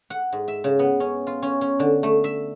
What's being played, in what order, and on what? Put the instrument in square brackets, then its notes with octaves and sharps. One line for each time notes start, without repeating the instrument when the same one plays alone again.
[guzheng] F#5
G#2
E5
C#3
B3
C#4
F4
C#4
C#4
D3
A3
E5